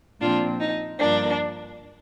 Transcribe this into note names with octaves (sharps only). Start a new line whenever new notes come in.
A#2 F3 C4 D4 F4
D#4
G2 F3 A#3 D4